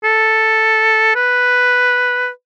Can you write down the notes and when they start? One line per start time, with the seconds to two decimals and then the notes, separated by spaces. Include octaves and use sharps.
0.04 A4
1.16 B4